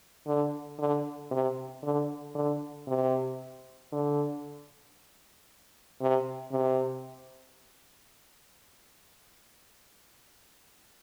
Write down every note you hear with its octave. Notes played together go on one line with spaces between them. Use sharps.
D3
D3
C3
D3
D3
C3
D3
C3
C3